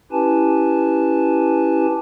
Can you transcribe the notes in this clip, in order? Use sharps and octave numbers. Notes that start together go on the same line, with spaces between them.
C#4 E4 G4 B4 G#5 A5